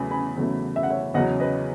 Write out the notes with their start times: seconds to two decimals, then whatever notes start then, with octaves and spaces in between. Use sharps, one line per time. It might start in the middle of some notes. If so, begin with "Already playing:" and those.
Already playing: E2 C#3 F#3 A3 G#5 B5
0.11 G#5 B5
0.37 E2 C#3 F#3 A3
0.76 E5
0.83 F#5
0.90 C#5 E5
1.14 E2 C#3 F#3 C#4 D#5 F#5
1.40 B4 D#5